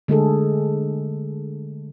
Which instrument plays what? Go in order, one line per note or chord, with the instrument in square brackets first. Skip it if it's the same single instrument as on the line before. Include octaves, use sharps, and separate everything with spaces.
[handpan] D3 G#3 A3 G#4 A4